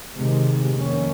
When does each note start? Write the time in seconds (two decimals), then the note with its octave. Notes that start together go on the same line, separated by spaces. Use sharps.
0.16 C3 D#3 G#3
0.75 F2 D#3 A#3 C#4